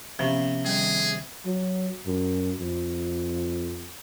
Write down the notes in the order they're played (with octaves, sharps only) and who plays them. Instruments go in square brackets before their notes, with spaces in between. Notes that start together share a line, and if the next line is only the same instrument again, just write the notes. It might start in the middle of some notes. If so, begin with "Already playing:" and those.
[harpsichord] C3 [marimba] F3 B3 C#4
[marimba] D#3 G3 [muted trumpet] G#4
[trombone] F#3
F#2
F2